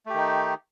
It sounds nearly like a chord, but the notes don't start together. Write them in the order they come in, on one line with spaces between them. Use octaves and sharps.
A3 G4 D#3 D#4